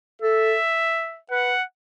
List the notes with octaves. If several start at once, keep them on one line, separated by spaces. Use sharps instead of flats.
A4 E5
B4 F#5